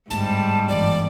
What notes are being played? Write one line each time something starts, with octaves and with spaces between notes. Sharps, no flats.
G1 G#2 G3 A3 A5
G1 E3 D5